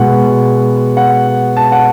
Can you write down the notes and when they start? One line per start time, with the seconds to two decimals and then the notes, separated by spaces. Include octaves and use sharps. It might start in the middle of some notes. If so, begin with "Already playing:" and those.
Already playing: B2 G#3 F#5
0.97 F#5
1.57 A5
1.72 F#5